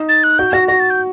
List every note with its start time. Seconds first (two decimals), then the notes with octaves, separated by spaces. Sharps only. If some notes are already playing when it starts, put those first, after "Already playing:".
Already playing: D#4
0.09 A6
0.23 F#6
0.38 F#4 G6
0.53 F#4 A#6
0.68 F#4 A#6
0.80 A6
0.90 G6